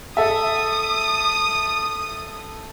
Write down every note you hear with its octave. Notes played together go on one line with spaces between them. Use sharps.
A4 E5 D#6